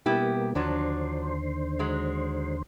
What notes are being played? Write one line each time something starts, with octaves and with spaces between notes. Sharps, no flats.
B2 G3 A#3 B3 E4 G4
D#2 D3 F3 F#3 D4 C5
F#3 G#3